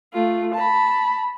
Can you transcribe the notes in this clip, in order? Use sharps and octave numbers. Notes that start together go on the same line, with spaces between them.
A3 F4
A5 B5